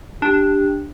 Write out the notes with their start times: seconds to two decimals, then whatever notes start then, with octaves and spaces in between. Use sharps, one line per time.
0.22 D4 G4